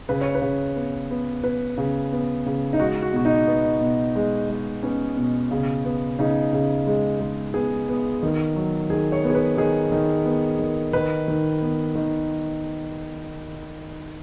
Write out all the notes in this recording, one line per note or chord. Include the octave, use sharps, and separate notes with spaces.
C#3 B4
C#5
B4
C#3
B3
B3
B3 B4
C#3
B3
C#3
D#4
G#3 F#4
F#4
B2 F#4
D#4
B3
B2
G#3
G#3
B3 C#4
B2
C#3
B3
C#3 D#4
C#3
G#3
G#3
B3 G#4
B3
D#3
F#3
D#3 G#4
C#5
B3
G#4
B4
D#3 G#4
D#3
B3
D#3
D#3 B4
D#3
B3
D#3